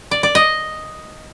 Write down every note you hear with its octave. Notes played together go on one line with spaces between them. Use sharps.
D5
D5
D#5